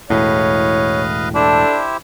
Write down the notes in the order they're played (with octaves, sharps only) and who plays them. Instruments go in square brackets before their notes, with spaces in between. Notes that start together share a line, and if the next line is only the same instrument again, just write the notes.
[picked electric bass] E1 A2 [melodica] B4 D#5 F5 [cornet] C#5
[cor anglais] D4 [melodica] E4 G4 C5 [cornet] A4